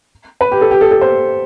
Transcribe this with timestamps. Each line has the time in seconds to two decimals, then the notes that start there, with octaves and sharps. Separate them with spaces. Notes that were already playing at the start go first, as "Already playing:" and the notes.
0.41 B4
0.52 G4
0.61 A4
0.71 G4
0.81 A4
0.91 A4
1.01 C5